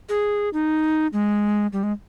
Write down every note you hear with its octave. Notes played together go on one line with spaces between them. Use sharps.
G#4
D#4
G#3
G3
G#3